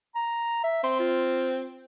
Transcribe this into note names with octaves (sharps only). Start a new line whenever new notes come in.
A#5
E5
C4 C6
F4